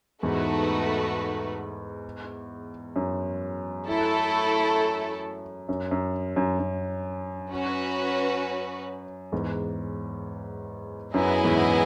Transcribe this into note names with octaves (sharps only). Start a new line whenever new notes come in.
E2 G#2 A3 D#4 F#4 B4
F#2
A3 E4 A4
F#2
F#2
F#2
F#2
C#4 F#4 B4
E2 G#2
F#2 B3 E4 G#4 D#5 G#5
E2 G#2